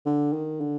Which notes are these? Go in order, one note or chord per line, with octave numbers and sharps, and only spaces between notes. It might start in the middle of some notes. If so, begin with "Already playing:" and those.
D3
D#3
D3